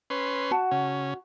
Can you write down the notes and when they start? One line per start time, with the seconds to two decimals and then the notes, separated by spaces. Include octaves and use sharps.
0.10 C#4 B4 C6
0.51 F#4 F#5 A5
0.71 C#3 C#4